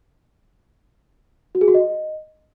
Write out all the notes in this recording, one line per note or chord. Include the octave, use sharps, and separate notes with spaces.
F#4
G#4
F#4
D#5